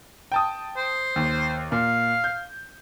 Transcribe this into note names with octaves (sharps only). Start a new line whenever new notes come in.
G5 A5 D#6
C5
D#2
A#2 F5
G6